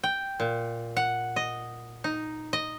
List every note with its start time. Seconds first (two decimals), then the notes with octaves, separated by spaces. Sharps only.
0.04 G5
0.40 A#2
0.97 F#5
1.36 D#5
2.04 D#4
2.53 D#5